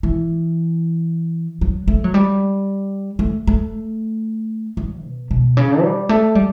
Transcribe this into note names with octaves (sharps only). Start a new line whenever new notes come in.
E3
F#3
A3
F#3
G3
A3
A3
G3
B2
B2
C#3
G3
A3
G3